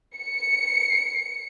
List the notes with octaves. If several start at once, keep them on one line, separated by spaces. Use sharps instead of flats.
C#7